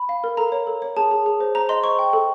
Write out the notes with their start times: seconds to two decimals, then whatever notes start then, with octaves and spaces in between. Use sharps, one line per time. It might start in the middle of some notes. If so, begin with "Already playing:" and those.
Already playing: B5
0.09 F5
0.24 A#4
0.37 A4 A#5
0.52 C#5
0.67 A4
0.82 C#5
0.97 G#4 A5
1.11 G#4
1.26 G#4
1.40 C5
1.55 C5 A#5
1.69 D#5 C6
1.83 C5 C#6
1.99 G5
2.13 A4